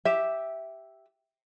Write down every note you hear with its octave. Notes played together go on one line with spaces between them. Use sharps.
G4 E5